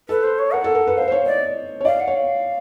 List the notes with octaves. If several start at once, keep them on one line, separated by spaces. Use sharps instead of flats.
A4 B4
C5
C#5
A#4 F#5
A4
A#4
B4
C5 F5
C5
C#5
D5 D#5
C#5
D5 F5
F#5
C#5
F5